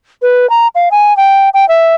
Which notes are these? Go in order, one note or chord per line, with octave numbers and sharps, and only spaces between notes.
B4
A#5
F5
G#5
G5
G5
E5